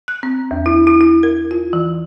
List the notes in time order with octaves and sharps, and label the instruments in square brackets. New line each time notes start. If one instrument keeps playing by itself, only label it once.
[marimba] F#6
C4
E2
E4
E4
E4
A#4
F4
E3